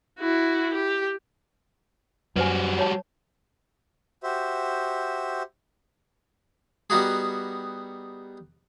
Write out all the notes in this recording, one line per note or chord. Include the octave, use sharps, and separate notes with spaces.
E4 F#4
G4
F#2 G3 F#4 B4 C5 G#5
C#5 A5
F#4 G4 C5 E5
G3 B3 D#4 F#4 G#4